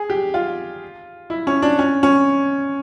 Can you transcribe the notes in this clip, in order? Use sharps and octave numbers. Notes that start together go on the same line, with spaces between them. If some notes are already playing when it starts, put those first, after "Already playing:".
Already playing: G#4
G4
F4
E4
C#4
D4
C#4
C#4